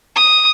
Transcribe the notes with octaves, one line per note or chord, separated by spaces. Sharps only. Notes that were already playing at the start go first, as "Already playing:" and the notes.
D#6